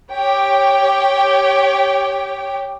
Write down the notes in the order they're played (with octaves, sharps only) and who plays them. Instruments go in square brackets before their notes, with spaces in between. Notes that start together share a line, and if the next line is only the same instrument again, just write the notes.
[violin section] G4 C#5 G5